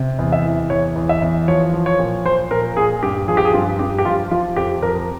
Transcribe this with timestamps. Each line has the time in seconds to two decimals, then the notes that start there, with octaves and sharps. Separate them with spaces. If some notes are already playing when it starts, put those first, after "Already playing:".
Already playing: C3
0.19 E2
0.32 E5
0.45 E3
0.70 E2 C#5
0.96 E2
1.09 E5
1.22 E2
1.48 F3 C#5
1.74 F3
1.86 C#5
1.99 A#2
2.25 F3 C5
2.51 A#2 A#4
2.77 A#2 G#4
3.03 G2 G4
3.28 F3 G#4
3.37 G4
3.45 G#4
3.54 G2 F4
3.79 G2 G4
3.98 G4
4.05 F3 F4
4.31 F3 F4
4.56 F2 G4
4.82 F2 A#4